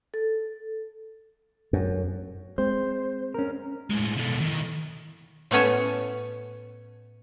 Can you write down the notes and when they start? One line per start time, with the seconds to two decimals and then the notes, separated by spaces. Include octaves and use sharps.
0.14 A4
1.73 F#2
2.58 G#3 C4 C5
3.34 C#4 A#4
3.90 A2 G#3
4.17 B2 A3
4.40 D#3 E3
5.51 A2 A3 B3 C#4 C#5 A5